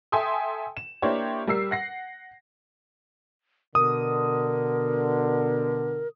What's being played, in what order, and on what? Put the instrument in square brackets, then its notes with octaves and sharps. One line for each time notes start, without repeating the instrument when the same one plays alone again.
[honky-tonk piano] A4 E5 G5 G#5 C6 D#6
E7
A#3 D4 E4 G4 C5 C#5
G3 A#4 E6 C7
F#5 A#6 C7
[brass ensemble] B2 D3 [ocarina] A#4 [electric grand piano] D#6